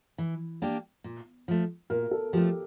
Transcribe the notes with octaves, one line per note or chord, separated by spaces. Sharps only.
E3
A#3 D4 G4
A#2
F3 A3
A#2 A#4
A4
F3 A3 G4